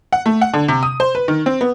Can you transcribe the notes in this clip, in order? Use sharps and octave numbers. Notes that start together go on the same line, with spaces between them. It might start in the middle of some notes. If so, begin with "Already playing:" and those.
F#5
A3
F#5
D3
C3
D#6
C5
B4
D#3
C4
B3